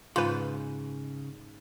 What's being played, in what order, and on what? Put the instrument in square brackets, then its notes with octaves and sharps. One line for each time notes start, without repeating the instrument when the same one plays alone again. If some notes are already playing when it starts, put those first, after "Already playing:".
[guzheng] G#2 [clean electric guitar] C#3 [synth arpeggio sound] F4 B4